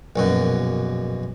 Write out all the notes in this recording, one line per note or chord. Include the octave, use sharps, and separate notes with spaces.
A#1 F#2 B2